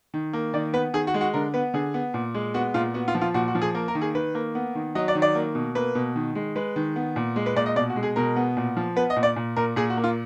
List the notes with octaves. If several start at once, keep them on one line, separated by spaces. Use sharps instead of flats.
D#3
A#3
D#3 D5
B3 B4
D#3 G#4
F#4
G#3
F#4
D3 A#4
B3 B4
D3 G#4
B3
A#2
G#3
B3 F#4
A#2 F4
B3 F#4
F4
F3
F4
A#2 F#4
F#4
F3
G#4
A#3 A#4
A#4
D#3
G#4
D#3 B4
A#3
B3
D#3
F#3 D#5
D5
D#3
D5
A#3
B2
A#3 B4
B2
D#3
G#3
G#3 B4
D#3
B3
A#2
G#3
B4
A#2 D5
D#5
B2 D5
F#4
G#3
G#4
B2 A#4
B3
A#2
F3
B3 B4
D#5
A#2
D5
A#2
A#2 A#4
A#2 G#4
F#4
A#3
F4